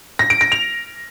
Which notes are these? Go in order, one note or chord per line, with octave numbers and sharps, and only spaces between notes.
A#6
D7
A#6
F7